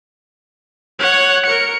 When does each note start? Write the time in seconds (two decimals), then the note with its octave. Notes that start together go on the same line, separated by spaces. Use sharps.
0.99 C#5 F#5
1.46 A#4 C#7